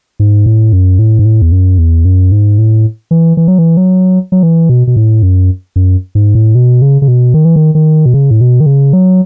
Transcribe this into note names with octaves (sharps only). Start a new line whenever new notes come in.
G#2
A2
F#2
A2
G#2
A2
E2
F#2
E2
F#2
G#2
A2
E3
E3
F#3
E3
F#3
F#3
E3
B2
B2
A2
F#2
F#2
G#2
A2
B2
C#3
C#3
B2
D#3
E3
D#3
D#3
B2
C#3
A2
B2
D#3
C#3
F#3